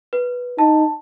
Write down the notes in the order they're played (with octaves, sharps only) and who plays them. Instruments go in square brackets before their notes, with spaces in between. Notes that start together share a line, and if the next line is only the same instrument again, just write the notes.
[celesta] B4
[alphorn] D#4 [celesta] A5